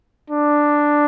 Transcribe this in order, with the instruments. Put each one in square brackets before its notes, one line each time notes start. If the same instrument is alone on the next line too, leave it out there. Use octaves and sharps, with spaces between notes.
[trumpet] D4